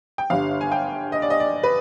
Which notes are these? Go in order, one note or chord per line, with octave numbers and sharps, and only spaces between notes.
G5
G1 G2 D3 F5
G#5
G5
D#5
D5
D#5
D5
B4